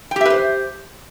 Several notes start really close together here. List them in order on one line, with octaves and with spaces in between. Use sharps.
G5 G4 E5 B4 C5